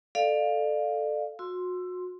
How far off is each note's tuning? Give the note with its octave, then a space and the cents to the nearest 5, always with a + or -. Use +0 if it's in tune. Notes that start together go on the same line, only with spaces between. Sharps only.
A4 +0 D5 +30 F5 +0
F#4 -30 C6 +0 E6 +20